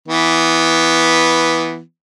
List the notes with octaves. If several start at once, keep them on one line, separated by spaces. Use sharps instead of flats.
E3 B3